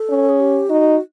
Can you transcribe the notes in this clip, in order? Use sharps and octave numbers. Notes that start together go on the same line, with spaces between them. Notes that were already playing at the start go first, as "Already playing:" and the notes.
Already playing: A4
C#4
G#4
G4
D#4 F#4